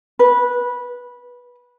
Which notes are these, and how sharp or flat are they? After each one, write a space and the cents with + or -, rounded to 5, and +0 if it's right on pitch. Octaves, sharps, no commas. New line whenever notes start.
B4 -15